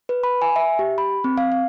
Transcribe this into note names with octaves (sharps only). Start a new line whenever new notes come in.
B4
B5
G#5
E5
G4
B5
C4
F5
F5